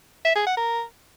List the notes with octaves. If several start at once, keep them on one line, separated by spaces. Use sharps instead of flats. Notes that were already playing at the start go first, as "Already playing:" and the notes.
E5
G#4
F#5
A#4